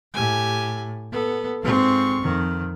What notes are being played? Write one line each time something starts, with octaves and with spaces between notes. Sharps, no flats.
A2 G4 G#5
B3 A4
G#2 C4 F4 C#6
F2 D#3